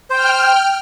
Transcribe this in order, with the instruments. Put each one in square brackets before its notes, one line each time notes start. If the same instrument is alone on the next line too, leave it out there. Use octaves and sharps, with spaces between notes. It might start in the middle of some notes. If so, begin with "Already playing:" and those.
[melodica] C5 [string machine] G5 F6